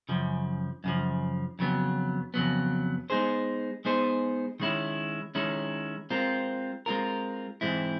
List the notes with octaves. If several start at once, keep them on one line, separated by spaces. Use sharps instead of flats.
F#2 C#3 F3
F#2 C#3 F3
F2 C#3 F#3 B3
F2 C#3 F#3 B3
G#3 B3 D#4 G#4 C5
G#3 B3 D#4 G#4 C5
D#3 G#3 C#4 E4
D#3 G#3 C#4 E4
G#3 C4 F4 A#4
G#3 C4 F4 A#4
G#2 E3 G#3 C4 E4